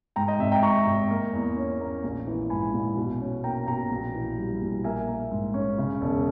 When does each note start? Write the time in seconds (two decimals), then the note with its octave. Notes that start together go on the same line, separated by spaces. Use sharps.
0.16 G#2 G5 A#5
0.28 D#5 G5
0.39 G#1 E5
0.52 G5 A#5
0.63 G#2 A#5 C#6
0.87 G#1
1.10 A#3
1.33 E2
1.57 C#4
1.80 A#3
2.04 A#1
2.27 E3
2.50 G#2 G#5 B5
2.74 A#1
2.96 B2
3.20 C#4
3.44 A#3 G5 A#5
3.67 B2 G5 A#5
3.91 A#1
4.14 E3
4.38 G3
4.61 A#1
4.84 A#3 E5 G#5
5.08 A#3
5.31 G#2
5.54 C#4
5.78 C#3
6.01 E1